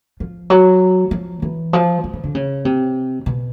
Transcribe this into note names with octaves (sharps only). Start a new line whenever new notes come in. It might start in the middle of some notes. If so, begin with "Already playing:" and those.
F3
F#3
F3
E3
F3
F3
E3
D3
C#3
C3
B2